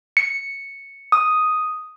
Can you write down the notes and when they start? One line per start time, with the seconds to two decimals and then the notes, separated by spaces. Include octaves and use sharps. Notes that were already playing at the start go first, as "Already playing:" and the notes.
0.17 C#7
1.12 D#6